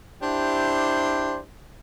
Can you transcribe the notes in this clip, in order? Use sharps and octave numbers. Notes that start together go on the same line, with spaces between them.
D4 E4 G4 C5